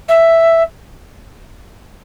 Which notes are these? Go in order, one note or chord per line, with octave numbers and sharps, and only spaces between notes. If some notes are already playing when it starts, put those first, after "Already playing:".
E5